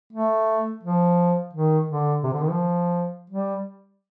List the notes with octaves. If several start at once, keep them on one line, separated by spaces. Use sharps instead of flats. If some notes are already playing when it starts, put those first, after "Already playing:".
A3
F3
D#3
D3
C3
D3
D#3
F3
G3